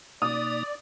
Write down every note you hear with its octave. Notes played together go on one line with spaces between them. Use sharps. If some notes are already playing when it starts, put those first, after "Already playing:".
B2 A#3 D#4 D5 D#6